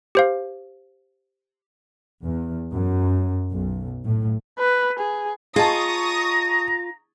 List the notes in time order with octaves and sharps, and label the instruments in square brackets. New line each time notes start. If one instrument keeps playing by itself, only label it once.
[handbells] G4 C5 F5
[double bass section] E2
F#2
B1
A2
[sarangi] B4
G#4
[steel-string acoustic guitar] F4 [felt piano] G#4 D#5 A5 [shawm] A#5 [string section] C#6 D#6